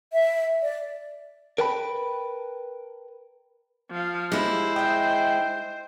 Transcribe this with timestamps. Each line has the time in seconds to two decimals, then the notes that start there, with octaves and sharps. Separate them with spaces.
0.13 E5
0.62 D5
1.58 A#4 B4 G5 A5 B5
3.91 F3 F5
4.32 G#3 A#3 E4 G4 C5
4.76 D#5 E5 G5